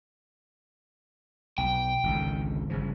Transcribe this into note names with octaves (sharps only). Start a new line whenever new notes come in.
B1 G5
G#1 C#2 D3
G1 C#3 F3